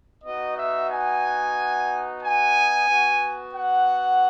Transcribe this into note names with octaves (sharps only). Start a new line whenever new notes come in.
B3 D#4 F#4 D#5
E5
G#5
G#5
B3 F#4
F#5